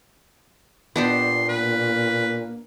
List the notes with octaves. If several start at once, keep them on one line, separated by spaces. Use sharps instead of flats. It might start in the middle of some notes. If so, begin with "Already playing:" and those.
A#2 B3 D4 G4 C6
A#3 B4